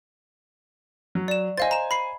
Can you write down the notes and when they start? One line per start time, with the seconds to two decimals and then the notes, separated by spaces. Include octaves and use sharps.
1.15 F#3
1.28 D5 E7
1.58 C5 D#5 F5 G#5 A6
1.71 A#5 E7
1.91 B5 C7